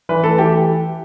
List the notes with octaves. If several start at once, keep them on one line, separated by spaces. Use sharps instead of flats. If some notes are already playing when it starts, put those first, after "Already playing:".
E3 B4
A3 A4
E3 G4